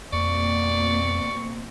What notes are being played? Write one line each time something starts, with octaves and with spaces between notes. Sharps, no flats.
F2 B2 A#3 C4 D5 C#6